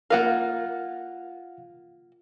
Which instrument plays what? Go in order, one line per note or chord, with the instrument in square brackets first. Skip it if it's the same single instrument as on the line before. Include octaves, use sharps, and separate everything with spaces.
[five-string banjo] A#3 F4 A#4 [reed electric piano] F5 F#5